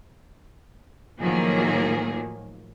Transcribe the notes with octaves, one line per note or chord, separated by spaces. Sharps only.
A2 D#3 F3 F#3 A#3 G#4